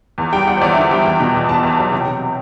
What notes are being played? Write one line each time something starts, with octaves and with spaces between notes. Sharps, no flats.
E2
G3 G5
G3 F#5
C5
E2 D5
E5
D3
G3 G5
E2 G5
B2
E2
E2 A5
E2
F#3
C3 G5
C3